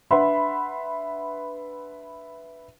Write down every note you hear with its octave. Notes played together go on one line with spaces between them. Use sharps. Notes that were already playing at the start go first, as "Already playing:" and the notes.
D4 B4 E5 F#5 B5 C6